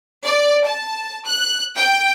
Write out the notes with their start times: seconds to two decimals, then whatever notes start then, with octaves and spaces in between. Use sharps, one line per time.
0.23 D5
0.65 A5
1.25 F#6
1.75 G5